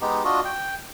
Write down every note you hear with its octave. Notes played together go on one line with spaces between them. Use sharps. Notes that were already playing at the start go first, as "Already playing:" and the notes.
G#3 B3 D#4 G4
D4 F4 F#4 D#5
G5